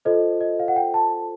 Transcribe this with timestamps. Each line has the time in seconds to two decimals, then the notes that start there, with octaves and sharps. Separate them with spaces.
0.05 F4 A4 C5 D#5
0.41 D#5
0.59 F5
0.68 F#5
0.76 G5
0.94 A5